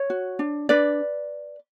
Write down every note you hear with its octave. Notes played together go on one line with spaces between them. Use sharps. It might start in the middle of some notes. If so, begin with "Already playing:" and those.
Already playing: C#5
F#4
D4
D4 B4 D5